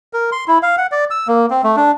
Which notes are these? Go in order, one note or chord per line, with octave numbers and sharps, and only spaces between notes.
A#4
C6
E4
F5
F#5
D5
E6
A#3
C4
A3
D4